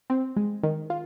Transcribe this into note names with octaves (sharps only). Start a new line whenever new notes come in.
C4
G#3
D#3
F4